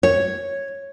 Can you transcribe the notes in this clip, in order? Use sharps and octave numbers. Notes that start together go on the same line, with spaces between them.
C#5